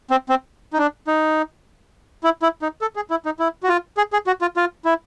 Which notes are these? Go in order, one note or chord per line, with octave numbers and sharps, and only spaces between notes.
C4
C4
D#4
D4
D#4
E4
E4
D#4
A4
G#4
E4
D#4
E4
F#4
F4
G#4
G#4
F#4
F4
F4
E4